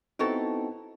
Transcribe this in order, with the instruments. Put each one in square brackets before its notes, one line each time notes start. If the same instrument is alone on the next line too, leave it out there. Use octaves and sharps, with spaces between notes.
[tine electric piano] B3 C4 D#4 [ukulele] E4 F#4 A4